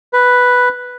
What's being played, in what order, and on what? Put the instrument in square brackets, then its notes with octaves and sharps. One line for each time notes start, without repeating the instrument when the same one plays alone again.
[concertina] B4